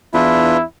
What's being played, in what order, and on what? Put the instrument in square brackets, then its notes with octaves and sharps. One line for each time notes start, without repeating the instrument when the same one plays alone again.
[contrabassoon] E2 [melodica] D4 F4 B4 [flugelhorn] E4